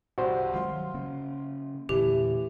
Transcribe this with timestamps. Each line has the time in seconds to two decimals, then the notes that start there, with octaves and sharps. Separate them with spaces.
0.18 C2 G2 C3 F#4 C5
0.54 D#3 F#3 G#3 F4 C6
0.73 F#3
0.94 C#3 A#3 C#4
1.89 E1 A#2 D3 E3 A3 G4